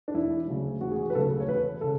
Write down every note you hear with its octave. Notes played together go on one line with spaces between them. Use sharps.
D4
E1 E4
D2 C#3 F#3
E1 F#4
G#4
F#4
B4
D2 C#3 F#3 A4
C#5
E1 B4
C#3 A4